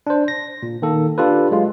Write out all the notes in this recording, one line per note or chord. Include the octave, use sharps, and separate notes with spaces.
D4 C5
A#6
A#2
D#3 A#3 A4
D4 F4 G4 A4 B4
F#3 G#3 F4